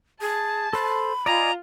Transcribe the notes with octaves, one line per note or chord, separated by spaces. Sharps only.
G#4 A5
A4 C5 B5
F4 D5 D#5 G#5 A#5